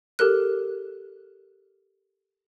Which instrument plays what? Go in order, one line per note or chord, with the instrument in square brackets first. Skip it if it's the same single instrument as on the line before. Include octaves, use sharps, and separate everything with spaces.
[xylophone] G4 A4 A#4 F#6